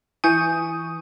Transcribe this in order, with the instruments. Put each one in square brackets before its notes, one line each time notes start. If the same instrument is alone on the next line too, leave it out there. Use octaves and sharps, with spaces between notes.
[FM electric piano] E3 C#6 D#6 [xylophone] G#5 G6